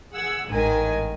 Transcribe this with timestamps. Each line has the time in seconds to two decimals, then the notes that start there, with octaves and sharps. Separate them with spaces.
0.11 G#4 F#5 E6 G#6
0.47 A1 G#2 D#3 G#5